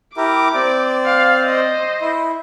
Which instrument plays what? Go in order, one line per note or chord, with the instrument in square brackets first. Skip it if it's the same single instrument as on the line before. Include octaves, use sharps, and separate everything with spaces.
[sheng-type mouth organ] E4 G4 A#4 [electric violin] D6
[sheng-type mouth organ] C4 D5
[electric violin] F5
C5 D#5
[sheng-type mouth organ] E4